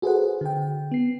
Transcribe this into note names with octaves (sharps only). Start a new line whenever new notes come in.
F#4 G#4 A4 B4 C5 F#5
D3 G5
B3 C7